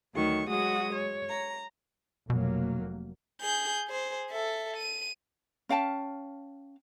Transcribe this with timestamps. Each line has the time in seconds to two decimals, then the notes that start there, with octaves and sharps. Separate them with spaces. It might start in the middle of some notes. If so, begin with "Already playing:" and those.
0.15 D2 D#3 F#3 C#6
0.49 F#3 G#3 F#4 D#6
0.94 C#5
1.28 A#5
2.30 F1 B2 F#3 A#3
3.41 G#4 G6
3.88 G#4 C5
4.31 A4 E5
4.77 D#7
5.69 C#4 F5 G5 A5